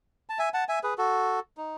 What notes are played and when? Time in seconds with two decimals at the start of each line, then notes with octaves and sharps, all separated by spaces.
0.29 A5
0.39 E5 G#5
0.54 F#5 A5
0.69 E5 G#5
0.83 G#4 B4
0.98 F#4 A4
1.57 D#4